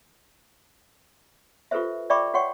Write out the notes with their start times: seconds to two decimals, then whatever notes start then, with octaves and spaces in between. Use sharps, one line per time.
1.71 F4 G4 A4 B4 C5 E5
2.10 D5 E5 G5 B5 C#6 D6
2.34 F#4 C#5 F#5 G5 C#6